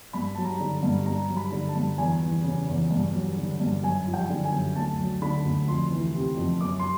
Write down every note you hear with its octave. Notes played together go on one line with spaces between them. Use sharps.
G2 B5
F#3 A5
A#5
D3
G2
G2 A#5
F#3
B5
D3
A5
G2
E2 G#5
E3
C#3
E2
G2
F#3
D3
G2
F#2 G#5
F3
G5
D3
G#5
F#2
D2 A5
F#3
D3 B5
D2
F2 C6
E3
C3
F2
F#2 D6
C6